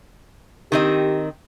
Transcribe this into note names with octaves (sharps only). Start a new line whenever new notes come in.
D#3 C4 G4 D#5